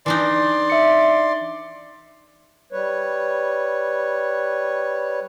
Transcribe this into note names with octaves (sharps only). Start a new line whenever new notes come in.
E3 D4 D#4 D5 C6
E5 C#7
G3 B4 C#5